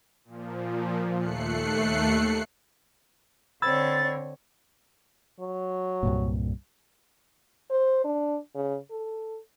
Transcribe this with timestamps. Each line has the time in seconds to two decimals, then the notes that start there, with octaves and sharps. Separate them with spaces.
0.25 A#2 F3
1.19 D#2 A3 F#6 C7 C#7
3.62 D3 C4 C#5 B5 E6 G#6 A6
5.40 F#3
6.03 C2 G2 A#2
7.70 C5
8.04 D4
8.55 C#3
8.91 A4